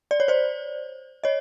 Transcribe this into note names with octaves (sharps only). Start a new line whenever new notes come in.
D5
C#5
C5 D5
C#5 D#5